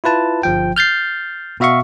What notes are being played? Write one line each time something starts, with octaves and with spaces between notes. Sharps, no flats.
E4 F4 B4 A5
G1 F3 G5
F6 G6 A6 C7
B2 F#4 E5 F5 C#6